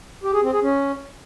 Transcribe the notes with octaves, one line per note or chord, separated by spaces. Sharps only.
G4
G#4
C4
G#4
C#4